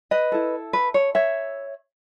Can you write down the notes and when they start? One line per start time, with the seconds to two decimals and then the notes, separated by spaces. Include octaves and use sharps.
0.11 B4 D#5
0.32 E4 A4
0.73 B4
0.94 C#5
1.15 C#5 E5